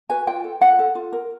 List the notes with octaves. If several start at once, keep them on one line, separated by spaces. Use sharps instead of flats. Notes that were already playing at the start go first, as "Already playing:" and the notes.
F#4 B4 G#5
F4 G5
A4
F4 F#5
A4
F4
A#4